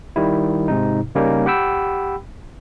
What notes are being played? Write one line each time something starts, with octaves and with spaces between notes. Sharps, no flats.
D#3 G3 E4
G#2 C3 D#4
C#3 G3 A#3 C#4 D#4
G4 F#5 G5 B5 E6